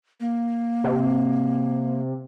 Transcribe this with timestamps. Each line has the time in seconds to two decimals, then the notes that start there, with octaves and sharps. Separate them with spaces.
0.20 A#3
0.84 C3